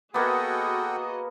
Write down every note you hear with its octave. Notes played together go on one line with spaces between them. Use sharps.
A#3 B3 F#4 G#4 A4 D#5 F#5 G5